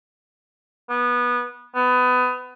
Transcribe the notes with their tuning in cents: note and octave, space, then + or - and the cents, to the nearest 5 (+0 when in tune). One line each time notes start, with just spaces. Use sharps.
B3 -20
B3 +20